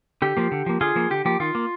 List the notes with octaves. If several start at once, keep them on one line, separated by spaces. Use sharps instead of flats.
D3 G4
F3 A#3
D3
F3 A#3
D3 F4 G#4
F3 A#3
D3 G4
F3 A#3 G4
D#3 F4
A#3